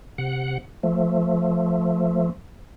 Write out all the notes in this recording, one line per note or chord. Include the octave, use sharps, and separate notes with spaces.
C3 F#5
F3 A3